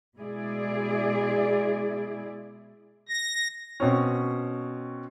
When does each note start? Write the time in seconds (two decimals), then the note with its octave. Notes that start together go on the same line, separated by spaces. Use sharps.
0.17 B2 G#3 E4 G#4 D5
3.09 A#6
3.80 B2 C4 C#4